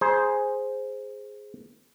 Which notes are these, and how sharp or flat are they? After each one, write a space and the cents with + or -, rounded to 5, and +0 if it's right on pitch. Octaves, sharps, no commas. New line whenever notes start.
G#4 +0 C5 +0 A#5 +40